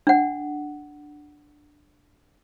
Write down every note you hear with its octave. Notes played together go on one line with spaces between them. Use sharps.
D4 F#5